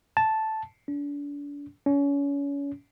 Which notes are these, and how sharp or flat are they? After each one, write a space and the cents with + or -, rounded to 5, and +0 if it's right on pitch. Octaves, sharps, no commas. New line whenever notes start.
A5 -5
D4 -35
C#4 +30